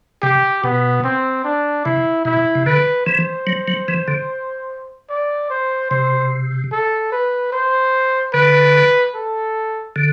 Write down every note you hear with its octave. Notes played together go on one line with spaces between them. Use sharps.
C3 G4
B2 B3
C4
D4
C3 E4
B2 E4
C3
D3 B4
E3 C5
F#3
F#3
E3
D3
D5
C5
C3 C5
A4
B4
C5
D3 B4
A4
D3